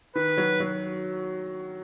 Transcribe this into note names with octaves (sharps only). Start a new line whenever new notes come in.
D#3 B4
F#3
F#3